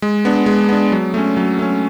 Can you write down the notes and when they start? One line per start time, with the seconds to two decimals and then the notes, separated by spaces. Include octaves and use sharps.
0.02 G#3
0.25 B3 D4
0.46 G#3
0.69 B3 D4
0.92 F#3
1.14 A3 C#4
1.37 F#3
1.59 A3 C#4